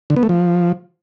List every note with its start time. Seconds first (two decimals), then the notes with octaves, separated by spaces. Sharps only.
0.10 D3
0.16 B3
0.23 A3
0.29 F3